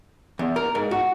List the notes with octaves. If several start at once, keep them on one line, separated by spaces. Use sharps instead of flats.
E2
A#4
G#2
F#4